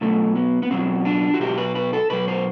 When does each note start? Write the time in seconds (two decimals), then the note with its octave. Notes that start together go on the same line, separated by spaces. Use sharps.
0.01 B2 F#3 A3
0.36 B3
0.63 B3
0.71 B2 F#3 C4
1.05 D4
1.34 F#4
1.40 B2 F#3 G4
1.58 B4
1.75 B4
1.93 A4
2.10 B2 F#3 B4
2.28 C5